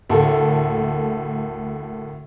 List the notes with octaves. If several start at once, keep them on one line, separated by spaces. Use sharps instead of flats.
D2 A2 A#3 A4